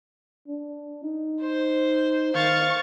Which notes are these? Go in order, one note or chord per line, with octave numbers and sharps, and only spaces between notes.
D4
D#4
C5
D#3 F5 C#6 A6